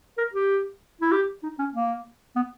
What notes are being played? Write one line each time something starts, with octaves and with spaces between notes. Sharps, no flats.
A#4
G4
E4
G4
D#4
C#4
A#3
B3